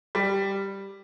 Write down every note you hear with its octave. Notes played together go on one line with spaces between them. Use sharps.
G3